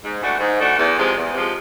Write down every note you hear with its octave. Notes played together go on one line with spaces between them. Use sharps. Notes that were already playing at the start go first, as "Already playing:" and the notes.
G#2
E3 A3 D4 F#4
G#2
E3 A3 D4 F#4
E2
C3 F3 G#3
E2
C3 F3 G#3